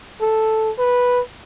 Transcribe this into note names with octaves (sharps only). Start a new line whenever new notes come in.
A4
B4